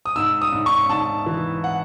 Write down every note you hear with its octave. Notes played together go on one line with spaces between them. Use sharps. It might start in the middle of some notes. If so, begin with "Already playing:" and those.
D#6
G#2 E6
D#6
G#2
C#6
G#2 A5
E3
F#5